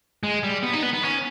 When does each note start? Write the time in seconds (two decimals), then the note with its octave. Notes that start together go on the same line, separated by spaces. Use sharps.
0.23 G#3
0.43 G3
0.63 B3
0.73 D#4
0.83 B3
0.93 B3
1.03 C#4